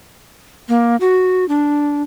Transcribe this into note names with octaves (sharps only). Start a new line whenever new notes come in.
A#3
F#4
D4